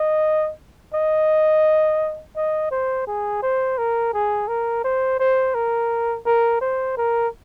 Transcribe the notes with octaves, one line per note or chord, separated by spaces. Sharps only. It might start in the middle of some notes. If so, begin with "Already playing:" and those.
Already playing: D#5
D#5
D#5
C5
G#4
C5
A#4
G#4
A#4
C5
C5
A#4
A#4
C5
A#4